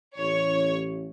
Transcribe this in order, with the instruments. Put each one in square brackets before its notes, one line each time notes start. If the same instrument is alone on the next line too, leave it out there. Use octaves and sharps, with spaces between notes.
[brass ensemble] A1 [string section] C#5